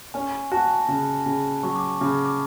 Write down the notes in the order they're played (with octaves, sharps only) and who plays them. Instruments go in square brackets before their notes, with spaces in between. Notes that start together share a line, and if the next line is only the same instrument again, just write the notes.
[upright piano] C#4 [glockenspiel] G#5
[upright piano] F#4 [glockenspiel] A5
[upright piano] C#3
C#3
[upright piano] F#3 [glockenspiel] C#6
[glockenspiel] D6
C#6
[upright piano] C#3 [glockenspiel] D6
[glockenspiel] C#6
D6